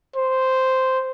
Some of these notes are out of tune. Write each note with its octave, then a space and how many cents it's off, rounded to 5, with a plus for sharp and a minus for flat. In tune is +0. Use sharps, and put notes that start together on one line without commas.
C5 -5